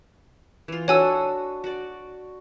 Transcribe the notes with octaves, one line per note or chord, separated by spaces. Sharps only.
E3 F4
D4 F#4 A4 C#5 G#5 E6
F#4 D5